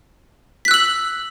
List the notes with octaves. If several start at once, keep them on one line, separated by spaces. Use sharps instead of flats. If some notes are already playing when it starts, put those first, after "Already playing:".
E6 F#6 B6 F#7